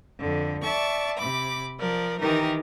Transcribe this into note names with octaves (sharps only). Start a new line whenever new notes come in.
F2 D3
D5 E5 A5 C#6
C3 B5 D6
F3 A#4 D5
D#3 E3 D#4 G4 A#4